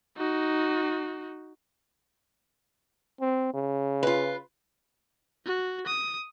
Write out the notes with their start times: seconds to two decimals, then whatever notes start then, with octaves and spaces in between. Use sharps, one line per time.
0.18 D#4 F#4
3.21 C4
3.54 C#3
4.03 F4 B4
5.45 F#4
5.87 D#6